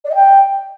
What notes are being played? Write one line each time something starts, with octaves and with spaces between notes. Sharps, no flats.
D5
D#5
G5